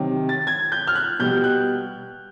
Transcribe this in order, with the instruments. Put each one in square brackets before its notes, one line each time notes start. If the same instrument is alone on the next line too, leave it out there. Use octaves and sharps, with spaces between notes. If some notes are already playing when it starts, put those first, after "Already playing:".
Already playing: [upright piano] C3 D#3 F#3
A6
G#6
G6
F6
F#6
B2 G3 G6
F#6